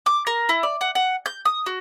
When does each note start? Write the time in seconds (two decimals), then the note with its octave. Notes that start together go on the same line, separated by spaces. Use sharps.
0.06 D6
0.27 A#4
0.49 E4
0.63 D5
0.81 F#5
0.95 F#5
1.26 G6
1.45 D#6
1.66 F#4